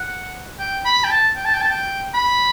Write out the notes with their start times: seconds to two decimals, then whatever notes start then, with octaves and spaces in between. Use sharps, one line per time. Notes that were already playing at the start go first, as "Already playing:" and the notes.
Already playing: F#5
0.59 G5
0.85 B5
1.04 G5
1.10 A5
1.36 G5
1.45 A5
1.53 G5
1.61 A5
1.70 G5
2.14 B5